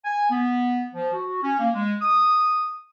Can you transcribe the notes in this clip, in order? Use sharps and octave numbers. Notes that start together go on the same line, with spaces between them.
G#5
B3
F3
F#4
C#4
A#3
G#3
D#6